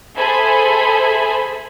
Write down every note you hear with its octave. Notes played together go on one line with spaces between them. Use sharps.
G#4 A4 C5 E5 G#5 B5